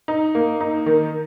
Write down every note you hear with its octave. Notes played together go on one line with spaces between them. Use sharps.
D#4
A#3
D#4
D#3